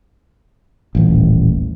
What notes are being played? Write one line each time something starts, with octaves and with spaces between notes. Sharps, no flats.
D#1 A1